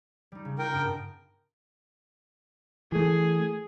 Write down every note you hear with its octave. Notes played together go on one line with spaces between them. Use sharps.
G3 D#4
C#3
D#4 F4 A#4 G5
G2 B3 A5
E3 A3 G#4